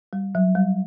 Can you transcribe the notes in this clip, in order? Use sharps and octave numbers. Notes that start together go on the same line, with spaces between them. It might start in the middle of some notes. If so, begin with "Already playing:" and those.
G3
F#3
G3